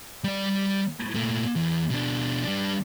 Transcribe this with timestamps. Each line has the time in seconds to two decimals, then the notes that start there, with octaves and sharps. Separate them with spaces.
0.24 G3 D5
1.15 A#2 A3
1.56 E2
1.90 B2 D4
2.44 G3 D4